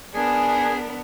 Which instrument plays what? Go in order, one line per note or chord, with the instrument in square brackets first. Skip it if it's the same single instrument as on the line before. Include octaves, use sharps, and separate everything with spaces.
[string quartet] B3 D4 A#4 [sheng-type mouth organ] G#4 G#5